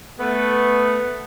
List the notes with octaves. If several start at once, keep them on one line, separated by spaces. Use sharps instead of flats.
A3 B3